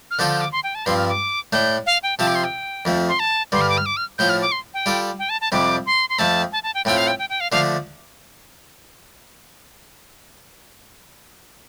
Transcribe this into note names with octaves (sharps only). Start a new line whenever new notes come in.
F6
D3 F3 D4 F4 A4 G6
G6
D6
C6
G5
A5
G2 F3 C4 C6
F6
D6
A2 A3 D4 G6
F5
G5
C3 F3 C4 F4 A5
D6
C6
G5
F2 F3 A3
C6
A5
G2 D3 G3 C6
F6
D6
F6
D6
F6
A2 F3 A3 F4 G6
F6
D6
C6
G5
G3 F4 A4 D5
G5
A5
A5
F2 C3 G3 D4 D6
C6
C6
F2 F3 A3 C4 A5
A5
A5
G5
A2 A3 C4 F4 G5
F5
G5
G5
G5
F5
D3 F3 A3 D4 F5